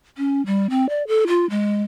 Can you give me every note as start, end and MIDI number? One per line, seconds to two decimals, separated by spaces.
0.18 0.44 61
0.46 0.69 55
0.70 0.88 60
0.89 1.03 74
1.07 1.24 69
1.27 1.49 65
1.50 1.83 56